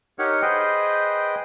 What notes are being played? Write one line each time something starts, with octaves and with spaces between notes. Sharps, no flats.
D#4 G4 A#4 C#5 F#5
G#4 B4 C5 D#5 G5